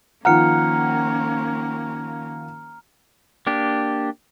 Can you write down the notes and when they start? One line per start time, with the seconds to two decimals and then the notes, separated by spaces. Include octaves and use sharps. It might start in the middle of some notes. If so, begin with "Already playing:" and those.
0.25 D#3 F3 A#3 C#4 F#5 A#5 F6 C#7
3.47 A#3 D4 G4